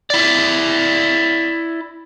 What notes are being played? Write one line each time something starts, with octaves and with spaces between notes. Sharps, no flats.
E4 D5